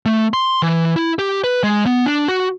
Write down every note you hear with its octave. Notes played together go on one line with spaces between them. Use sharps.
A3
C6
E3
E4
G4
B4
G#3
B3
D4
F#4